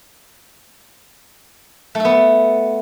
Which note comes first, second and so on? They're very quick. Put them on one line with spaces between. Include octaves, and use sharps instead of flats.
A3 A4 B3